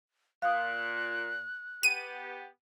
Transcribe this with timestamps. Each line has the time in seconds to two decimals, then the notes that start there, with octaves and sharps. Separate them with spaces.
0.42 A#2 F5 D#6 F#6
1.83 B3 G4 D#7